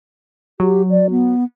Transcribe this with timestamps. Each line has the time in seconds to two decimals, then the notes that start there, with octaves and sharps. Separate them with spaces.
0.60 F#3 G4
0.90 D5
1.10 B3